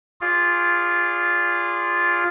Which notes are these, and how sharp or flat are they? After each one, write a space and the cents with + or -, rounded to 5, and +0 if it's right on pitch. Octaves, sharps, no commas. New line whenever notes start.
F4 +0 G#4 -20 D5 -20